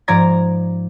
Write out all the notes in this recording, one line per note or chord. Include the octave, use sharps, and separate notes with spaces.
G#2 F3 D5 A#5 G#6 A#6